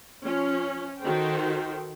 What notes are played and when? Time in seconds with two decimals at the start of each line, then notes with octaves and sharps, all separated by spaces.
0.22 F3 C#4
1.01 D#3 F#4 A4 C5 G5